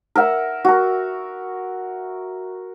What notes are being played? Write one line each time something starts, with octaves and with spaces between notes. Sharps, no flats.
A#4 E5 F#5
F#4 A#4